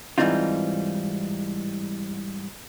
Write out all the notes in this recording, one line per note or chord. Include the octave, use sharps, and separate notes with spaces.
G#2 E3 G3 C4 D#4 F4